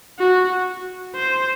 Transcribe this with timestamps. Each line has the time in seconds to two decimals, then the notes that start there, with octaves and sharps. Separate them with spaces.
0.19 F#4
1.15 C5